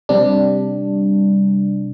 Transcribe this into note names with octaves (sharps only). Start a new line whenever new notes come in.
C3 G3 D4